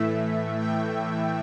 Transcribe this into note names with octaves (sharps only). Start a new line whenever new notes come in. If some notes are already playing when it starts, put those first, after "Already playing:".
Already playing: A2 E3 A3 E5
G5